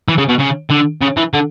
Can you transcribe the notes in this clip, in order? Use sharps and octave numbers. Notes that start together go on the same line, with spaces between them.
E3
C#3
B2
C#3
D3
C#3
E3
D3